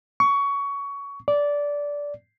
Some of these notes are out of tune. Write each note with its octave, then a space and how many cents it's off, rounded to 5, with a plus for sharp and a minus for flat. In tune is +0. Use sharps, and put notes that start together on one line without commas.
C#6 +20
D5 -15